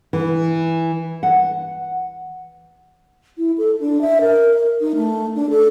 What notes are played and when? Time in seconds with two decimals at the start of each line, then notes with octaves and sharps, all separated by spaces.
0.13 E3
1.23 F#5
3.38 E4
3.58 A4
3.80 D4
4.01 E5
4.21 A#4
4.80 D#4
4.95 A3
5.36 D4
5.50 A4